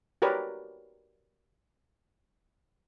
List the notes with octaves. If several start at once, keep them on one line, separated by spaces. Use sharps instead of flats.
F#4 G4 A#4 B4 C#5 D5